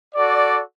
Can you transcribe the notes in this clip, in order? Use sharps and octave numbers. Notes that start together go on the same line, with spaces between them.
F#4 A4 D5